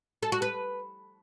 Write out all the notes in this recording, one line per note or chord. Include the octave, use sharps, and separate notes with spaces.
A4
F#4
B4